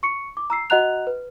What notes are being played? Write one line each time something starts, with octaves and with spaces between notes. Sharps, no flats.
C#6 C#7
D6
A#5 E6 C7
F#4 D#5 F#5 A#5 F#6 F7
B4